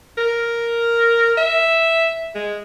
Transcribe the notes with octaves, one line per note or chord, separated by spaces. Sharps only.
A#4
E5
G#3